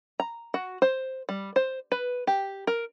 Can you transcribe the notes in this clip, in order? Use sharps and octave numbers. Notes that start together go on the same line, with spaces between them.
A#5
F#4
C5
G3
C5
B4
G4
A#4